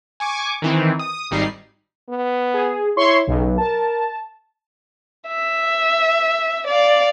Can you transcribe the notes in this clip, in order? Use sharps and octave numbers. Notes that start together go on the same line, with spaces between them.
G#5 C#6 D6
D#3 E3 C4
D#6
G#1 G3 D#4 C7
B3
G#4
E4 C#5 C6 C#6
B1 C#3
A#4 A5
E5
D5 F5